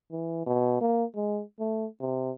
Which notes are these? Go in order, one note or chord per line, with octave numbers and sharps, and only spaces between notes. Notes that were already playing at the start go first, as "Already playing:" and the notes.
E3
B2
A#3
G#3
A3
C3